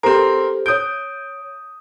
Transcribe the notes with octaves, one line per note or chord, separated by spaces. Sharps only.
C4 G4 A4 A#4 C5
C#5 D#6 G6 D7